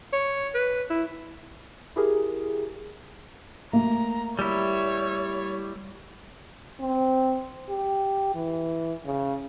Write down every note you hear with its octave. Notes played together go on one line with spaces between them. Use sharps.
C#5
B4
E4
E4 G4 G#4 A#4
A3 A#3 A#5
G3 E4 C#5
C4
G4
E3
C#3